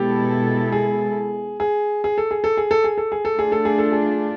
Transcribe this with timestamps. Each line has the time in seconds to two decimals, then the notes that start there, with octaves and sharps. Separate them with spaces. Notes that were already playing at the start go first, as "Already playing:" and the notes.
Already playing: B2 G#3 B3 E4 G4 A4
0.72 G#4
1.60 G#4
2.04 G#4
2.18 A4
2.31 G#4
2.44 A4
2.57 G#4
2.71 A4
2.84 G#4
2.98 A4
3.12 G#4
3.25 A4
3.35 A3 D4 F4 G#4
3.52 A4
3.65 G#4
3.79 A4
3.92 G#4